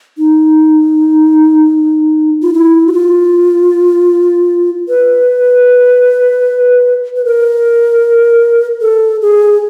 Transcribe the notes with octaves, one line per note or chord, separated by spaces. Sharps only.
D#4
F4
E4
F#4
F4
B4
B4
A#4
A4
G#4